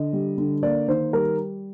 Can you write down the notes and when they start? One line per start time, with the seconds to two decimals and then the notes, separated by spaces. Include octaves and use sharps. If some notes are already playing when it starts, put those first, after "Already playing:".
Already playing: D3 D#5
0.13 G3
0.38 D3
0.63 A#3 D5
0.88 D#3 C5
1.13 G3 A#4